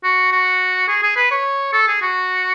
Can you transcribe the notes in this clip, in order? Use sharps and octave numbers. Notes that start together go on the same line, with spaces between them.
F#4
F#4
G#4
G#4
B4
C#5
A4
G#4
F#4